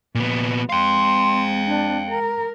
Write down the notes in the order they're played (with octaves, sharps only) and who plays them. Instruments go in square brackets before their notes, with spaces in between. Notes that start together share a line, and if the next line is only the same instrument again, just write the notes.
[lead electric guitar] A#2 B3 [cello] F3
[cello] G#3 C4 [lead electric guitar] F5 G5 [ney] C6
[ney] D4
[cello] A#4 [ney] A#5